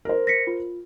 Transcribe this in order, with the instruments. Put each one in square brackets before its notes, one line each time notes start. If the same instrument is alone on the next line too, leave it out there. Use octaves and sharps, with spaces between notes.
[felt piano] A#4 C5
[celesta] A#6 B6 C#7
F4